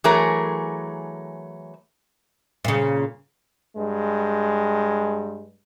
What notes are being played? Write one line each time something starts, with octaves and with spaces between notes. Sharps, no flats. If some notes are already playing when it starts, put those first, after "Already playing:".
E3 F#3 A3 G#4 A#4 C#5
A#2 C#3
G2 G#3